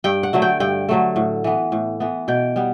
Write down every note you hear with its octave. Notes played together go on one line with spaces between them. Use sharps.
G2 G5
F#5
D3 F#3 A3
G5
G2 G5
D3 F#3 A3
A2
E3 B3
A2
E3 B3
B2 G5
G3 B3